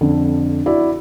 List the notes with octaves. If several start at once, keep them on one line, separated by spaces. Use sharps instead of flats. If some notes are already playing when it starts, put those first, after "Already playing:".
F2 D3
E4 F#4 D5